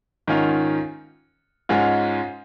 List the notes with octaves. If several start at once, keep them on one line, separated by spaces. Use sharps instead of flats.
G#2 D#3 C#4 F4
G#2 G#3 C#4 F4